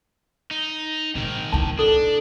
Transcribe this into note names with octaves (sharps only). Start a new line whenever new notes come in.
D#4
A#1 G#2 D#3
B1 E4 A5
D4 A4